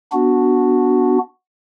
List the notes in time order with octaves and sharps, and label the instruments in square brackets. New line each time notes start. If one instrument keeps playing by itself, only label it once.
[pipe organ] B3 D4 F#4